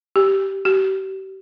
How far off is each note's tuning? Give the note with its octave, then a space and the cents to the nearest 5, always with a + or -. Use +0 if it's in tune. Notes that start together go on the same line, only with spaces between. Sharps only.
G4 -15
G4 -40